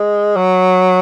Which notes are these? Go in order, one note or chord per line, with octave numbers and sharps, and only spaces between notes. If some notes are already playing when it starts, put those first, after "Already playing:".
Already playing: G#3
F#3